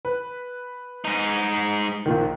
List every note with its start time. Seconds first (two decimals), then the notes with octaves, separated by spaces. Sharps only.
0.05 B4
1.05 G#2 D#4
2.06 A#1 A#2 D#3